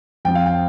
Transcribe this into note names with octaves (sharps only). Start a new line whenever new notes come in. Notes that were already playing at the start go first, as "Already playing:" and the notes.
F2 F3 C4 G5
F5
G5